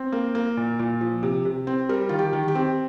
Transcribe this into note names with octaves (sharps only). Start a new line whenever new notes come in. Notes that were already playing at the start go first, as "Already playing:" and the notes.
Already playing: C4
A#3
A#3
A#2
A#2
F3
C3
C3
C4
G3 A#4
D#3 F4
G4
D#3
G4
C4